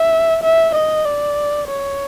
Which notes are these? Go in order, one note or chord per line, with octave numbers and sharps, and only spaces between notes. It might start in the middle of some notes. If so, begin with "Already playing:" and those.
Already playing: E5
E5
D#5
D5
C#5